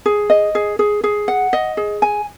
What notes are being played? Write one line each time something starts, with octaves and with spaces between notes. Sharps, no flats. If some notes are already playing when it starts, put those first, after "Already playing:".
G#4
D#5
G#4
G#4
G#4
F#5
D#5
G#4
G#5